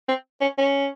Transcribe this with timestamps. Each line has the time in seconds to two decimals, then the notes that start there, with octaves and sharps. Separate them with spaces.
0.08 C4
0.41 C#4
0.58 C#4